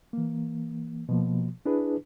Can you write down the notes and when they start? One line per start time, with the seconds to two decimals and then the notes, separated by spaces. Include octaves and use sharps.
0.13 E3 A#3
1.09 B2 F3 A#3
1.66 D4 E4 G#4 B4